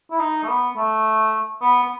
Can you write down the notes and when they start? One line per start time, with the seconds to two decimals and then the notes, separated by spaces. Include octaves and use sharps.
0.10 E4
0.19 D#4
0.43 A3
0.48 B3
0.77 A3
1.61 B3
1.83 B3